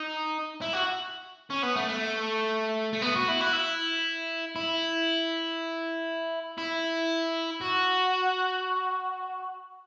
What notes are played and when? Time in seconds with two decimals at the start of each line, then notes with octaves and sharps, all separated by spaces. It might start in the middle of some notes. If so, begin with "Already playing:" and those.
Already playing: D#4
0.61 E4
0.73 F#4
1.50 C#4
1.63 B3
1.76 A3
1.89 A3
2.93 A3
3.02 B3
3.16 F#4
3.28 E4
3.41 F#4
3.53 E4
4.56 E4
6.58 E4
7.61 F#4